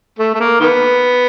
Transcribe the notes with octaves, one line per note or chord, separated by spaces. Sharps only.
A3
A3
A#3
D#3 B3